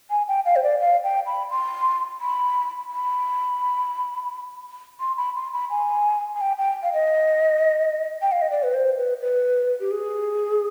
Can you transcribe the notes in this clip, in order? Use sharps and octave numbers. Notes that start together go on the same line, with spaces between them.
G#5
G5
F5
C5
D5
F5
G5
B5
C6
B5
B5
C6
B5
C6
B5
G#5
G#5
G5
G5
F5
D#5
G5
F5
D#5
D5
B4
C5
B4
B4
G4
G#4